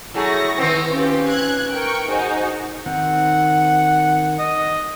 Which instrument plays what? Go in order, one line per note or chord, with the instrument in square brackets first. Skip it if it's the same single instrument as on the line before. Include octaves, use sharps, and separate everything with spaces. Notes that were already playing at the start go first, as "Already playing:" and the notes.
[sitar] F#3 A3 G#4 [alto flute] E4 [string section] C#6 A#6
[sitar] D#3 B3 C4
[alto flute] C#4 [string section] F4 G4
[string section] F#6 G#6
A#4 G5 C#6
[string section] D#4 F#4 G#4 [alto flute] C5
[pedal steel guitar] D#3 C4 [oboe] F#5
[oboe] D#5